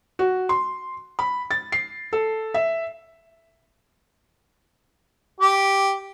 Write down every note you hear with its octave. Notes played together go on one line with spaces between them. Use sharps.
F#4
C6
B5
A6
C7
A4
E5
G4